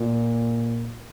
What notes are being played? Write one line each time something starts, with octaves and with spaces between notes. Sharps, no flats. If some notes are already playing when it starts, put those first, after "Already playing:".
Already playing: A#2